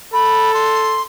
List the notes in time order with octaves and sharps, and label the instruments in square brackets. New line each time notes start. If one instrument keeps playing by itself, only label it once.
[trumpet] A4 [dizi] B5
[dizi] C6